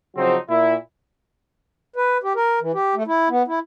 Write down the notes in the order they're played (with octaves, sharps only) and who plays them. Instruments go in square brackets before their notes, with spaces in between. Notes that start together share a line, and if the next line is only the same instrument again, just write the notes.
[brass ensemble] C#3 F3 F#3 C4 D#4 C5
A#2 E4
[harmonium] B4
G4
A#4
E3
G4
A3
E4
B3
E4